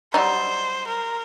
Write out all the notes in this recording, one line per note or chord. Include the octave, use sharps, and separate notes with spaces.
F#3 G3 D#4 C5
A#4